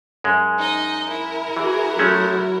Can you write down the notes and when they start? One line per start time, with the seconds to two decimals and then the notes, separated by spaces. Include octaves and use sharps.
0.24 F#2 G#3
0.59 D#4 D#5
1.09 E4 A#4
1.57 E3 F#4 G#4
1.99 F#3 G#3 A3 C#4 F#4